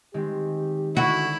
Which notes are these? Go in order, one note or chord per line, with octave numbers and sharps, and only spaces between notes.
D#3 G#3 C4 G4
D3 E4 F#4